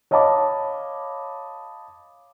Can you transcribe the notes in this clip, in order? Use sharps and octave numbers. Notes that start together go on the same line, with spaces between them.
C#5 D#5 F5 A5 B5 D6